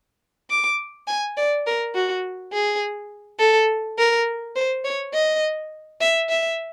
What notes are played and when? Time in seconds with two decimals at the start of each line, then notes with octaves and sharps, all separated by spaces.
0.50 D6
1.08 G#5
1.37 D5
1.66 A#4
1.95 F#4
2.53 G#4
3.39 A4
3.98 A#4
4.56 C5
4.85 C#5
5.14 D#5
6.01 E5
6.29 E5